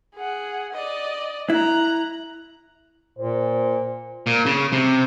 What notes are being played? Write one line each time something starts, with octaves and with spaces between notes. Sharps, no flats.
G#4 F#5
D5 D#5
E4 A#5 F#6
A#2 C5
A#2
C#3
C3